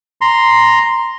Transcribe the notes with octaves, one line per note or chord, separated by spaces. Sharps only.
A#5 C6